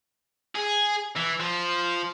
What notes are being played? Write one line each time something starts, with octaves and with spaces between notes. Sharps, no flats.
G#4
E3
F3